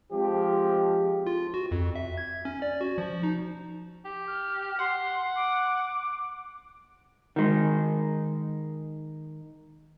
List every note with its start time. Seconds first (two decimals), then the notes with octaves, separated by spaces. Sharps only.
0.12 F3 G#3 C4 G4
1.26 F4
1.54 F#4
1.71 F2
1.96 E5
2.18 G#6
2.45 C#4
2.62 D5
2.81 F#4
2.98 F3
3.23 D#4
4.05 G4
4.27 F6
4.79 F#5 C6
5.36 D6
7.36 D#3 G#3